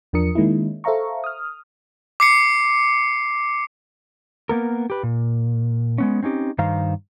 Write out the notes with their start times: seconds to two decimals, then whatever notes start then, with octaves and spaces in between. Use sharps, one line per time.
0.13 E2 F3 D4 A#4 D#6 C#7
0.35 D#3 G#3 A#3 C#4 D#4 E4
0.84 A4 C5 E5 F5 A#5 C#6
1.24 D#6 F6
2.20 D6 C7 C#7
4.49 A#3 B3 A#4
4.90 G4 B4
5.03 A#2
5.98 G#3 B3 C#4
6.23 C4 C#4 D#4 G4
6.58 G2 D#3 C5 F5 A#5